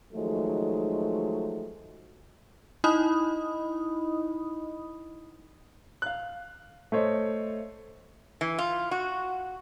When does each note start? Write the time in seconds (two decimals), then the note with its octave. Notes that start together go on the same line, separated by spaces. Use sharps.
0.14 D#3 F3 F#3 G#3 A3
2.84 D#4 E4 D#5 B5 D#6
6.02 F5 F#6
6.92 A3 C5 C#5 D#5
8.41 E3
8.59 F4
8.91 F#4